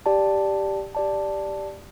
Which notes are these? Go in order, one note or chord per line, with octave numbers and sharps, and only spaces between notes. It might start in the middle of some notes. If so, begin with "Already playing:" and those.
G4 D5 A5
G4 D5 A5